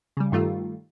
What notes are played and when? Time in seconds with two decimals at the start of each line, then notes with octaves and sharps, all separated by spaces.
0.17 C#3 G3
0.32 G2 D#3 G3 A3 F4